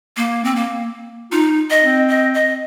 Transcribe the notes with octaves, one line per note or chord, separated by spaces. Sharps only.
A#3
C4
A#3
D#4 F4
D#5
C4
D#5
D#5